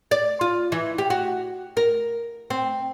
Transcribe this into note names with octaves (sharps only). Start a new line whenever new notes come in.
D5
F4
E3
G4
F#4
A#4
C4